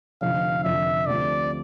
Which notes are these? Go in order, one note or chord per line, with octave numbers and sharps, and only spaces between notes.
F1 F2 D3 F5
F1 F2 D3 E5
D2 C3 F3 A3 D4 D5